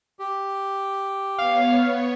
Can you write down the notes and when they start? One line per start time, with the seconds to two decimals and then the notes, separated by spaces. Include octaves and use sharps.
0.19 G4
1.38 B3 C#5 F5